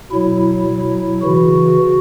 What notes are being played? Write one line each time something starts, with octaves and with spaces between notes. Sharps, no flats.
B2 F#3 E4
B2 F#3
C#3 E3 F#4